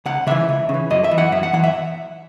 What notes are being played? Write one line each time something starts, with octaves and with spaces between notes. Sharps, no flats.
C#2 F#5
C#3 E3 E5
C#2
C#3
E3
F#2 D#5
E5
E3
F#5
F#2 E5
F#5
E3 F#5
E5